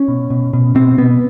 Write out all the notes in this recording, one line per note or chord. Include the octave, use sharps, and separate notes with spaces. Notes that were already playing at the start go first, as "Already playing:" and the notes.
Already playing: C#4
B2
B2
B2
B2 C4
B2 B3